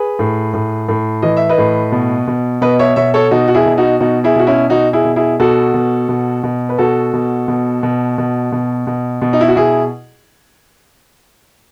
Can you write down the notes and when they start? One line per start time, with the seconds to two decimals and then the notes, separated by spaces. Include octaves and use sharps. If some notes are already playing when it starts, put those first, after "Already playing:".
Already playing: G#4 B4
0.19 A2
0.54 A2
0.89 A2
1.22 E3 D#5
1.37 E5
1.49 B4 D#5
1.58 A2
1.92 B2
2.27 B2
2.61 B2 B4 D#5
2.79 C#5 E5
2.96 B2 C#5 E5
3.14 A4 C#5
3.31 B2 D#4 F#4
3.48 F#4
3.54 E4 G#4
3.66 B2
3.77 D#4 F#4
4.00 B2 D#4 F#4
4.24 E4 G#4
4.36 B2 F#4
4.47 C#4 E4
4.70 B2 D#4 F#4
4.93 E4 G#4
5.05 B2
5.16 E4 G#4
5.40 B2 F#4 A4
5.74 B2
6.09 B2
6.43 B2
6.69 B4
6.78 B2 F#4 A4
7.13 B2
7.48 B2
7.83 B2
8.18 B2
8.52 B2
8.87 B2
9.22 B2
9.33 D#4
9.41 E4
9.48 F#4
9.56 B2 E4 G#4